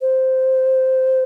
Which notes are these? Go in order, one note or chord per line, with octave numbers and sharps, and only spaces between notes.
C5